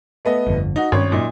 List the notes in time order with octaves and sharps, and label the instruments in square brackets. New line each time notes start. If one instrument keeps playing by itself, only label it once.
[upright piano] A3 B3 D#5
[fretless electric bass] G1 F2 D3
[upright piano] D#4 F#4
[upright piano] G#1 C#5 [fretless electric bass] G2 C#4
[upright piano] F#2 A#2 D#4